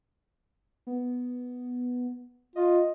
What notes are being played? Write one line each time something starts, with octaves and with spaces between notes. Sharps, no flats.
B3
F4 D#5